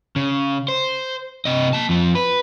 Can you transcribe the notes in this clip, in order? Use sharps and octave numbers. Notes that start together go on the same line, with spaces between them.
C#3
C5
C3 D#5
A#3 A5
F2 F3
B4